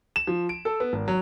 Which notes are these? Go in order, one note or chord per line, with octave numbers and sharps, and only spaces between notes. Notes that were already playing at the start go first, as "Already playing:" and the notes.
E7
F3
D7
A4
B3
G#1
F#3